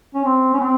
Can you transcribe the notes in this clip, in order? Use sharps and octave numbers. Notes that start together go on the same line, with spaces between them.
C#4
C4
C#4
C4